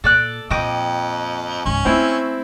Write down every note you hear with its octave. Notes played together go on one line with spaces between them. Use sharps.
A#2 A4 D5 F#6
F2 A#2 D#5 G5 D6
C#2 G#2 C#4
A3 C4 E4